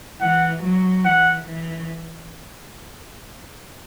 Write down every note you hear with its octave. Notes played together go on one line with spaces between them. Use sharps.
E3 F#5
F#3
E3 F#5
E3